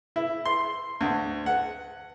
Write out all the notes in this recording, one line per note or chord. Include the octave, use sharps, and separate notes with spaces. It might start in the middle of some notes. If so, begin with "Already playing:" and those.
E4
C6
D2
F#5